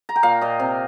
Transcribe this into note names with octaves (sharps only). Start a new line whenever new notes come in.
A#5
G5
A#2 F5
A#2 D#5
C3